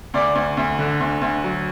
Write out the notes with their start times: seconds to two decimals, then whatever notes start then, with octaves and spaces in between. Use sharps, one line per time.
0.14 D2 D5
0.35 D2
0.57 D2
0.79 D3
1.00 D2
1.22 D2
1.44 F#3